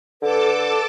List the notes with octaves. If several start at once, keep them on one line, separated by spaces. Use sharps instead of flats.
D3 A4 B4 A5 D6